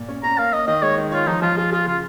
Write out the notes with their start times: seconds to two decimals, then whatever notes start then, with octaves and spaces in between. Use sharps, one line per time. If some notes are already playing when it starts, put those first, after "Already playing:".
Already playing: A#2
0.08 C#4
0.23 C#4 A#5
0.38 A#3 F5
0.53 A#3 D#5
0.67 D#3 D#5
0.82 G#3 C#5
0.98 D#3
1.12 F4 C#5
1.27 F3 D#4
1.42 F3 F4
1.57 F4 G#4
1.72 F4 G#4
1.86 C#3 F4